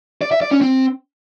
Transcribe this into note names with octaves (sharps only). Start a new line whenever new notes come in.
D5
E5
D5
C#4
C4